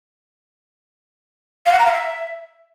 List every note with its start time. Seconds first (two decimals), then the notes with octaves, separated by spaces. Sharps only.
1.66 F5
1.72 F#5
1.79 A#5
1.85 F5
1.92 E5